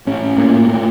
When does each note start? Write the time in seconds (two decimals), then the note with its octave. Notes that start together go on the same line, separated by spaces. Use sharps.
0.07 A2 C#4
0.37 A2 A#3
0.68 A2 A#3